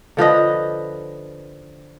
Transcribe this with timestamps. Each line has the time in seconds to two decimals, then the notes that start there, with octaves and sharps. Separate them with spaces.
0.17 D3 F3 B4 D#5